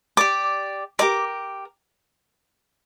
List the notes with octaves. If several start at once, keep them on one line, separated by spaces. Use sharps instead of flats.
G4 D5 D6
G4 A#4 D5 D6